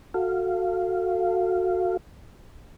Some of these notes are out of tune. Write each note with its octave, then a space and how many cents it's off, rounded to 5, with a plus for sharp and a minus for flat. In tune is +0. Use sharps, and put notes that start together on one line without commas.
F#4 -10 A4 +15 F5 -15